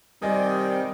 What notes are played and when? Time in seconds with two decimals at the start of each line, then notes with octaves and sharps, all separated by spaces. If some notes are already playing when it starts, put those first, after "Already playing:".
0.22 C3 D#3 G3 C4 D5 D#5 G#5